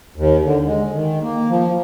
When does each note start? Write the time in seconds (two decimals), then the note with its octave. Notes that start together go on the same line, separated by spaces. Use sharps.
0.16 D#2
0.44 D3
0.66 G#3
0.93 D#3
1.22 A#3
1.50 F3